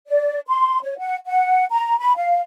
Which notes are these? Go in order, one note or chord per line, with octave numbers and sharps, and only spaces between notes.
D5
C6
C#5
F#5
F#5
A#5
B5
F5